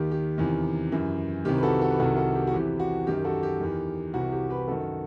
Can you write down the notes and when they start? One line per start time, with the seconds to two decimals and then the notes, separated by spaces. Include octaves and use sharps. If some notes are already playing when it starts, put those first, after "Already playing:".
Already playing: D#2 D#3 G4
0.11 G4
0.38 E2 C3 D#3
0.92 F#2 E3
1.45 C2 C3 D#3 G4
1.58 B4
1.63 F#4 A4
1.81 F#4 A4
1.91 B4
1.99 C2 C3 D#3 F#4 A4
2.17 F#4 A4
2.35 G4
2.47 F#4
2.52 E2 C3 E3 G4
2.79 F#4
3.07 F#2 D#3 G4
3.24 F#4 A4
3.43 G4
3.60 E2 D#3
4.14 C2 C3 E3 F#4
4.32 G4
4.50 G4 B4
4.67 F#2 D#3 F#4 A4